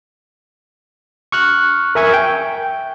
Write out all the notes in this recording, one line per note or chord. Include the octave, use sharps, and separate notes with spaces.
C#6 F6 F#6
A#4 E5 G#5 C#6 G#6
G5